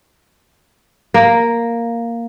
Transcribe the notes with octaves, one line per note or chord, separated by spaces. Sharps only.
A#3